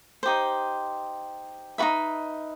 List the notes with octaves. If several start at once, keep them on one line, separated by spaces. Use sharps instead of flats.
D#4 G4 C5
D#4 F#4 B4 E5